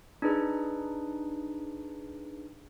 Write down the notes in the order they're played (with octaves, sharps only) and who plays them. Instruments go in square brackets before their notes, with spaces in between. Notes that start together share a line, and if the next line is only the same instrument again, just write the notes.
[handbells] D4 D#4 G#4 B4